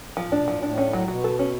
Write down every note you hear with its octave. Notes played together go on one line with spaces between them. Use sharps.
A2 F3
A2
D4
B2
A2 F3
B2
A2 D4
C#4
F#3
B2 F#4
A4
C#4